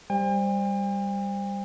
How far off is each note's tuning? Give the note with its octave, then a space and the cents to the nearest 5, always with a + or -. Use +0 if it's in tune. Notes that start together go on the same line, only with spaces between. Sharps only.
G3 +10 C5 +0 G5 +45